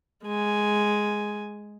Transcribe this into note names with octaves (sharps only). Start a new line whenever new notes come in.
G#3 G#5